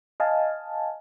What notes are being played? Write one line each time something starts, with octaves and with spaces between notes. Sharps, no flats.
D#5 F5 G#5 A5